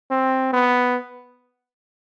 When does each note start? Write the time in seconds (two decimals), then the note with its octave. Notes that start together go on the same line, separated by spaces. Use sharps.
0.11 C4
0.53 B3